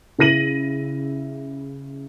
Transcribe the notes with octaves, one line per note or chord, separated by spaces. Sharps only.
C#3 E4 A#6 D#7 F#7